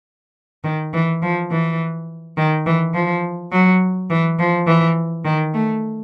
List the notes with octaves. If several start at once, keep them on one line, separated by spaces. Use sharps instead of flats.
D#3
E3
F3
E3
D#3
E3
F3
F#3
E3
F3
E3
D#3
A3